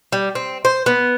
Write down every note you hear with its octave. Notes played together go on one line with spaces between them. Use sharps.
G3
C4
C5
B3